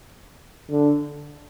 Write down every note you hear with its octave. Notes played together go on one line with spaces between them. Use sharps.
D3